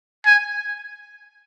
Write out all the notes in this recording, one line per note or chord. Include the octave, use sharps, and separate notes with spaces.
G#5